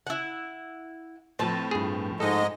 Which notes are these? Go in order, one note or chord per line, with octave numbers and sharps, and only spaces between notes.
E4 F#5
A2 F3 C4 B4 A5
G2 G#4
G#2 G#3 D#4 A4 D#5